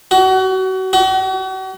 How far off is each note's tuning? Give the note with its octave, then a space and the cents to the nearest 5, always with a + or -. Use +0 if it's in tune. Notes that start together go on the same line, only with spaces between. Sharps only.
F#4 +30
F#4 +40